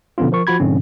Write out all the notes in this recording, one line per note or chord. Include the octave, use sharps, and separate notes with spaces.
B2 D3 F3 B3 C#4 F4
F3 A#4 C#6
F3 F4 F#4 B5 G#6
G#2 B2 D3 F3 C4 C#4